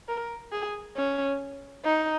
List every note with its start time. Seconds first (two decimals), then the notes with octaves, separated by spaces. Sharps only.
0.08 A#4
0.52 G#4
0.96 C#4
1.84 D#4